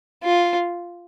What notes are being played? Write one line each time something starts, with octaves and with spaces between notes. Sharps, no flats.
F4